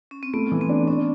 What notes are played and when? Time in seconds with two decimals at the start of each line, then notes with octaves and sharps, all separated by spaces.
0.11 C#4
0.23 C4
0.34 A3 B3
0.52 E3
0.61 C4
0.69 D4
0.88 C#4 D4